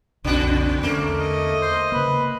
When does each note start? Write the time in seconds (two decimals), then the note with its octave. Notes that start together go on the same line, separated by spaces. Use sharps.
0.24 B1 F2 C#3 C4 D4 F#4
0.83 E2 D3 A3 A#3 C#4
1.18 D#5
1.62 C5
1.92 C#3 A#3 B4